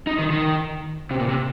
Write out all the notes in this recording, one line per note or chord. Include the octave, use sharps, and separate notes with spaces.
D#4
D#3
D#3
C3
A#2
C3